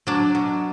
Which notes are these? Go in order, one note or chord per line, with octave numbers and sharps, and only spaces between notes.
F#3 D4
B2